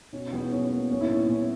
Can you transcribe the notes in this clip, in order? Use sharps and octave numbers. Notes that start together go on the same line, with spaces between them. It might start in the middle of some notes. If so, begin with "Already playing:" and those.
B2 C#4
E2 B3
F#3 C#4
A#3
A#3 C#4
E4
A#2 C#4
B3
A#2 C#4